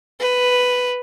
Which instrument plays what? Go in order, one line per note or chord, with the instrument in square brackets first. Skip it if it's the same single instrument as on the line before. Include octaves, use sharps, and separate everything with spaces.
[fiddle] B4